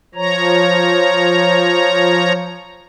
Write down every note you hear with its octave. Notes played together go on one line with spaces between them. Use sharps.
F3 C#5 A#5